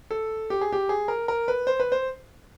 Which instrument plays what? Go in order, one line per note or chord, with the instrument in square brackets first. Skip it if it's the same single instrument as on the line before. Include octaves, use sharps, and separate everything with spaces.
[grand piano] A4
G4
G#4
G4
G#4
A#4
A#4
B4
C5
B4
C5